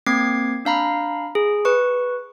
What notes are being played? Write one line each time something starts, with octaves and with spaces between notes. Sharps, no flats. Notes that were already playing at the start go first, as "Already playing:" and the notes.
A#3 C4 D6 G#6 C7
D4 F5 A#5 B5
G#4
B4 C#6